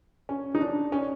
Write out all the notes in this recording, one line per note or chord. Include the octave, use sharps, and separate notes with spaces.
C#4
D#4
D4
C#4